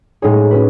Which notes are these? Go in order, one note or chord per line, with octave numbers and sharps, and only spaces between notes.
A2 G#3 D#4 G#4 C#5
C#4 F#4 B4